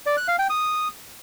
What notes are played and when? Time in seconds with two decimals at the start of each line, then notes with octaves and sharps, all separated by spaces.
0.06 D5
0.17 F#6
0.28 F5
0.39 G5
0.50 D#6